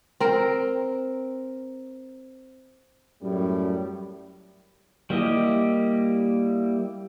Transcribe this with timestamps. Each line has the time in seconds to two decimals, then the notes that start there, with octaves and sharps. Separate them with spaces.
0.20 C4 A#4
3.22 F#2 A2 G3
5.10 G3 A#3 E4 G4 D#5